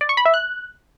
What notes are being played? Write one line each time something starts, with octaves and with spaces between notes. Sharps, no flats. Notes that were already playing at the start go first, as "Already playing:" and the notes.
D5
C#6
B5
E5
F#6